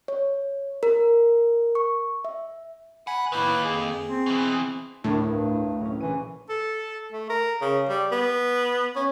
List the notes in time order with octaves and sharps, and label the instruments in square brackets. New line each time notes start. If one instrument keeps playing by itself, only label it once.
[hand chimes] C#5
A#4
C#6
E5
[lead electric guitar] F#5 [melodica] G#5 B5
[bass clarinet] A2 [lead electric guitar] D#3 A#3 [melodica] B4
[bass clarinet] F2 [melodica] G#4
[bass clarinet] C4
[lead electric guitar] B2 E3
[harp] D2 A#4 G#6 [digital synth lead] A2 [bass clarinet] D4
[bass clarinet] G2
[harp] F#3 C#4
[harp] A#1 F#4 D#7 [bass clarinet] E3
[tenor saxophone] A4
A3
A#4
C#3
G3
B3
C#4